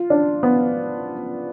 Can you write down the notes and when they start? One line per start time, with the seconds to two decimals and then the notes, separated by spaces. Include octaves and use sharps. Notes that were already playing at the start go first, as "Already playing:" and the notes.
Already playing: F4
0.10 D4
0.43 B3